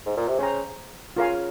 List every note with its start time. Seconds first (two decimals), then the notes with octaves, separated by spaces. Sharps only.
0.06 G#2
0.17 A#2
0.28 C3
0.38 C#3 G#4 C5 G5 A#5
1.16 C#3 F4 A#4 F5 G#5